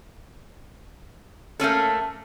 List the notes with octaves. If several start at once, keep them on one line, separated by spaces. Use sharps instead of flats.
A3 A#3 C#4 A4